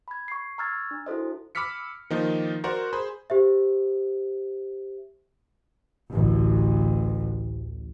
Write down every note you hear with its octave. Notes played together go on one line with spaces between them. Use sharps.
B5 G#6
C#6 C7
A#5 C#6 E6 F6 G#6 A6
D4
E4 F#4 A4 C5 D#5
B5 D6 E6 F6 B6 C#7
D#3 F3 A#3 D#4
F#4 A#4 C5 D5 F#5 A#5
G#4 C5 B5
G4 C5 E5
A1 D2